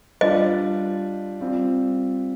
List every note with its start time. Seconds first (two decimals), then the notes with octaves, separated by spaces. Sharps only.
0.21 G3 D4 F4 D#5
1.41 G3 C4 F4